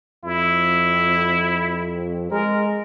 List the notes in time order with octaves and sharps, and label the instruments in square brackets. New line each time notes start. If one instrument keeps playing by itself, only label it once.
[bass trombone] F2 [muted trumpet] E4
[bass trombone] G#3 [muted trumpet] A#4